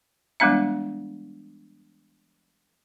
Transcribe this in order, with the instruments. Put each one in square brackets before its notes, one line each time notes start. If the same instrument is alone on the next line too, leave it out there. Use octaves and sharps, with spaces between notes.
[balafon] E3 G3 G#3 B3 D4 E5